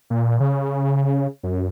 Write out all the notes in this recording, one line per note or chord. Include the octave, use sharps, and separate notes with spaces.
A#2
C#3
F#2